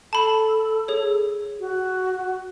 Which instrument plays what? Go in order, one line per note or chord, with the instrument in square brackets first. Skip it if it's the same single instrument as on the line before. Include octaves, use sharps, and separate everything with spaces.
[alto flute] A4 [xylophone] A5 B5
[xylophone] G#4 C#5
[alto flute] F#4